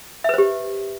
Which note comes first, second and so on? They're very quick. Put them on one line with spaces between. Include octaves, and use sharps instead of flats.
E5 B4 C5 G4